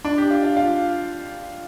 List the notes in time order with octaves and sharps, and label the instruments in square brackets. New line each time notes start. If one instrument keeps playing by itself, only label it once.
[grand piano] D4
G4
F4
F4
F4